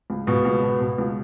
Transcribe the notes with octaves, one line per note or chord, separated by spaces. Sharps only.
C#2
C#2 B2 B3
C#2
B2
B2
C#2